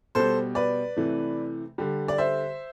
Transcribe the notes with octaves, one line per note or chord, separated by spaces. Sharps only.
B2 G3 A4 C5
B4 D5
C3 E3 A3
D3 G3
D5
C5 E5